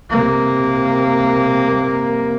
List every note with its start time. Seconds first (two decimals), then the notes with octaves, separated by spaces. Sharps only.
0.10 C3 A#3